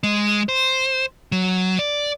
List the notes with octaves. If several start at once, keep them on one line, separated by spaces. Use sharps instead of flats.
G#3
C5
F#3
D5